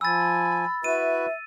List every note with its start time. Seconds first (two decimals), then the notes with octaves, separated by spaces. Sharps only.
0.01 F3 G#5 B5 E6 A6
0.84 E4 F#4 B4 E5 D#7